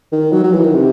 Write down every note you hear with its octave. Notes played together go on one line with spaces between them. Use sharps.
D#3
F#3
F#3
E3
D#3
C3